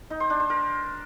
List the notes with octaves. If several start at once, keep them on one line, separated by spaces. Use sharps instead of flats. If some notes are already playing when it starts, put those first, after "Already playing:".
D#4
C5
D4
C5
A#4